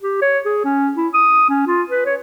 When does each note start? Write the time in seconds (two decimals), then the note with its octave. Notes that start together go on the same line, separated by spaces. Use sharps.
0.03 G4
0.22 C#5
0.45 G#4
0.65 C#4
0.97 E4
1.14 D#6
1.49 C#4
1.67 F4
1.90 B4
2.06 C#5